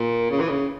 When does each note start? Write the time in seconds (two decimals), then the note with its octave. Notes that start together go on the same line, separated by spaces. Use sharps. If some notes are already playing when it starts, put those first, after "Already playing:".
Already playing: A#2
0.30 C#3
0.40 E3
0.49 C#3